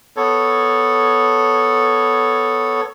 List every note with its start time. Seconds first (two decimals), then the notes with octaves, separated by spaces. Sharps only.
0.17 B3 A4 C#5